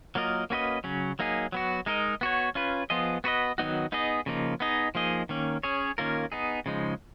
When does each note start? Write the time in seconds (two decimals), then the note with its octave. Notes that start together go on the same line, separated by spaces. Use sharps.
0.15 F#3 A#3 F4 A#4 D#5
0.50 A#3 C#4 F#4 B4 D#5
0.84 C#3 F#3 C#4
1.19 F#3 A#3 D#4 G#4
1.52 F#3 B3 F#4
1.86 G#3 D#4 A#4 D#5
2.21 B3 F#4 C#5
2.55 C#4 F4 B4
2.90 F3 B3 F4 G#4 D#5
3.24 B3 F#4 B4 D#5
3.58 D#3 F#3 B3 D#4 F#4
3.92 B3 D#4 G#4 D#5
4.26 C#3 F3 A#3 D#4
4.60 B3 D#4 G#4 D#5
4.95 F3 A#3 D#4 G#4 D#5
5.29 D#3 A#3 C#4
5.63 C#4 G#4 C#5
5.98 D#3 A#3 C#4 F4 A#4
6.32 B3 D#4 G#4
6.66 C#3 F3 G#3 D#4